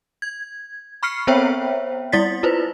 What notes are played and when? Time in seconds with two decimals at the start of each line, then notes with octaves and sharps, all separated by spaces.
0.22 G#6
1.03 B5 C#6 F6 C7 C#7
1.27 B3 C4 C5 C#5 E5 G5
2.12 G3 E4 D5 A6 B6
2.43 E4 F4 B4 C5